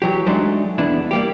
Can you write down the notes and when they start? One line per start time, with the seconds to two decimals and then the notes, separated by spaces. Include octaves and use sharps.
0.02 E3 F#3 G4
0.26 F#3 G#3 A3 D4 D#4
0.78 E2 B3 D4 E4
1.11 G3 A#3 G4